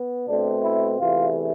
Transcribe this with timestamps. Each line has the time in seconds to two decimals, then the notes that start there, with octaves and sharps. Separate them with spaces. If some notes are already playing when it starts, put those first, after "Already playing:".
Already playing: B3
0.28 B2 A3 C4 D4
0.63 E4
0.99 E2 C3 E3 A3 F4